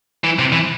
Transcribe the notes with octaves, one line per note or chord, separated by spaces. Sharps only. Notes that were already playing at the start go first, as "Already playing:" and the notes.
E3
C3
E3